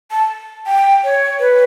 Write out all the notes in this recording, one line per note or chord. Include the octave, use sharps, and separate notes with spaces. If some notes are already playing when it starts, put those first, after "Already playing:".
A5
G5
C#5
B4